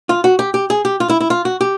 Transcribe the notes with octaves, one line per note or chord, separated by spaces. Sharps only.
F4
F#4
G4
G4
G#4
G4
F4
E4
E4
F4
F#4
G4